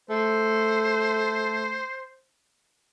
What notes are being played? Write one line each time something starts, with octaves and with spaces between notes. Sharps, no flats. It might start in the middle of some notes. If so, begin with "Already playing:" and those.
A3 C5